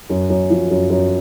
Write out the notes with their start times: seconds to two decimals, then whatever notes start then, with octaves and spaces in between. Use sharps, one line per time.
0.10 F#2
0.30 F#2
0.50 F3
0.71 F#2
0.90 F#2